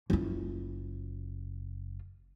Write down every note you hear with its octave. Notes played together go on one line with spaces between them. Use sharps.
F#1 F4